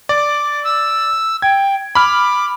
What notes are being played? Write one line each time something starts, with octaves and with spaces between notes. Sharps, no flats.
D5 D6
E6
G5 G#6
B5 D6 F6